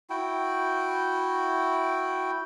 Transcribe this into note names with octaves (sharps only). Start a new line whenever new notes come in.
E4 F#4 G5